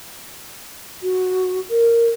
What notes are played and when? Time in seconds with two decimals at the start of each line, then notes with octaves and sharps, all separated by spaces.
1.03 F#4
1.70 A#4